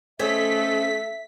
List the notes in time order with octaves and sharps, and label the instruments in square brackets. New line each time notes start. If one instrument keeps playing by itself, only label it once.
[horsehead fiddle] A3 A4 [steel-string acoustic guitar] C#4 C5 D#5 [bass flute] E5 [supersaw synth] B6